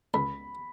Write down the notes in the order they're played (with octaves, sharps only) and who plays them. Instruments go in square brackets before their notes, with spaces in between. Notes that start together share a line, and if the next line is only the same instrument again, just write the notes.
[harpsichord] C#2 [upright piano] B5